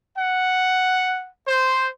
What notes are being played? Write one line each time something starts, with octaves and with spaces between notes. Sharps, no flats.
F#5
C5